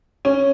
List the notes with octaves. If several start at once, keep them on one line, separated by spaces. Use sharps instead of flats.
C#4